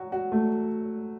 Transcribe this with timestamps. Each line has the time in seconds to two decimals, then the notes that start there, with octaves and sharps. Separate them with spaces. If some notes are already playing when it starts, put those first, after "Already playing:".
Already playing: F#3 F#4
0.12 F#4
0.32 A3